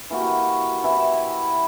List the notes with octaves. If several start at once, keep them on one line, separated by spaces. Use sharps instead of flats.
E3 A#3 F#4 G4
E3 E4